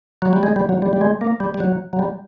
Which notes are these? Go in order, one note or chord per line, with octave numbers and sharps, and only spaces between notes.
F#3
G3
G#3
G3
F#3
G3
G3
G#3
A#3
G3
G3
F#3
F#3
G3